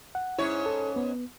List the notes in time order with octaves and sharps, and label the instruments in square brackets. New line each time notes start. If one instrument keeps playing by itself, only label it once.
[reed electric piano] F#5
[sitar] G#2 C#4 C#5 [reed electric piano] E4
[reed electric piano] A4
B3